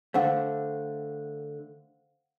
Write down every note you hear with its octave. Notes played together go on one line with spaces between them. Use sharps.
D3 A3 C5 F5 F#5